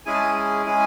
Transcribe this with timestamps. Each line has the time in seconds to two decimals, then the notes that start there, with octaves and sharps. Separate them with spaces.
0.06 G#3 C#4 E4 G#4 G#5
0.14 A5
0.21 G#5
0.66 G#3 C#4 E4 G#4 G#5